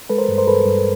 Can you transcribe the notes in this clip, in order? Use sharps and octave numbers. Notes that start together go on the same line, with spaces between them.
G#3 A4 B4
A#4 C5
G2
A#4 C5
G2 A4 B4
G2